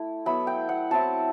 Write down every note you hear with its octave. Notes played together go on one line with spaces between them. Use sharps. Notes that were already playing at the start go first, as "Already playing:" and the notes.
Already playing: A3 E4
F#3 B3 E4 B5
G5
F#5
F#3 C4 E4 A5